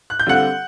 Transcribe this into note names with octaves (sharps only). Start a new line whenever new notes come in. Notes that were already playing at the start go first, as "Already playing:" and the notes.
F#6
G6
D3 G3 C4 F4 F#5 F#6